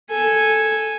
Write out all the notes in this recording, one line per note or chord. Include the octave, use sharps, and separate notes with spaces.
A4 G#5